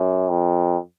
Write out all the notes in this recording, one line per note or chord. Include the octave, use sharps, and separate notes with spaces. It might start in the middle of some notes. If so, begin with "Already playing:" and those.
Already playing: F#2
F2